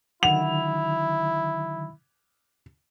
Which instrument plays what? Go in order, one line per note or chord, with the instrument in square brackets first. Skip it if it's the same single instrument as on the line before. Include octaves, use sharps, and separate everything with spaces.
[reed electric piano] D3 D#3 F#3 [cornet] E4 [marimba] F#5 [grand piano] F7